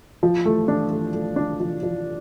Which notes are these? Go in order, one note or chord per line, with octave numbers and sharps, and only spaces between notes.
F3
A3
D4
A3
A3
D4
F3
F3